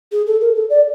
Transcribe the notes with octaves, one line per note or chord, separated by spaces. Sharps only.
G#4
A4
A#4
A4
D5